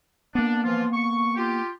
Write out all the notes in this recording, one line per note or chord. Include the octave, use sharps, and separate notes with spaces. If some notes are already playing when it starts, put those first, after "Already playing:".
A#3 B3 D4
E3 F3 F4
C#6
F4 G4